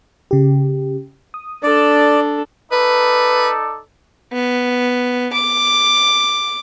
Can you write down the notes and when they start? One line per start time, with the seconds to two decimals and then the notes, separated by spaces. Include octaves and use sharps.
0.31 C#3 G4
1.34 D#6
1.63 D4 A4 D5
2.72 D#4 A4 B4 D5
4.33 B3
5.33 D6